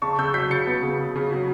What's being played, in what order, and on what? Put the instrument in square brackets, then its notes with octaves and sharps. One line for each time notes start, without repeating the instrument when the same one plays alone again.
[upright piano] C#3 A5 C#6
C#3 E6 G6
F#3 G6 B6
C#3 A6 C#7
B3
C#3
C#3
C#3
F#3